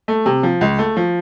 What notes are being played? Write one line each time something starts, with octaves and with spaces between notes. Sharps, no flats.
A3
C3
F3
C#2
A3
F3